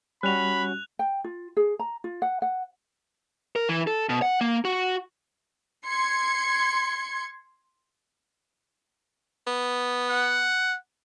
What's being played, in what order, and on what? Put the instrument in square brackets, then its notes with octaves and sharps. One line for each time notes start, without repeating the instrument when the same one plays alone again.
[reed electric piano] G3 [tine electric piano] C#4 F#4 [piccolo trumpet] B5 [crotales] F#6 F7
[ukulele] G5
F4
G#4
A#5
F4
F#5
F#5
[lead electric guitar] A#4
E3
A4
B2
F#5
A#3
F#4
[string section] C6 G#6 C#7
[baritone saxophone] B3
[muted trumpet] F#5